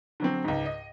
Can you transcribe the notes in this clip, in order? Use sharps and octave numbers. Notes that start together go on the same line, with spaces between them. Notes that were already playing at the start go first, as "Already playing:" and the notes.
D3 F#3 C4
C#2 G#2
D#5